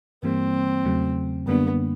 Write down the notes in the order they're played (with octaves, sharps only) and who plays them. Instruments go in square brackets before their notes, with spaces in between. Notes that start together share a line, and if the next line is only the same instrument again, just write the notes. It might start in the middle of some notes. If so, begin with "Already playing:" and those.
[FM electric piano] G2 E3 G3 A#3 [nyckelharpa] C4
[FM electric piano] E2 C#3 F#3 A3
[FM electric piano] F#2 D3 G3 A#3 D4 [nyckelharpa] B3